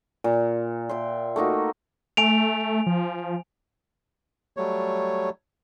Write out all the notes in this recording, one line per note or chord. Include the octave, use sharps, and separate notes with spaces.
A#2
E5 G5 C6
A3 A#3 D#4 F#4
A3 G#5 D7 F7
F3
F#3 G3 A3 C#5